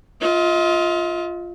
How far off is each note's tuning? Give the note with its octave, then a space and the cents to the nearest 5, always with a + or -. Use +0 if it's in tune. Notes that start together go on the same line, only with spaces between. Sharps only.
F4 +0 D#5 +40